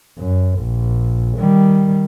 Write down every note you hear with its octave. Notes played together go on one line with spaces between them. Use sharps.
F#2
A#1
D#3 G3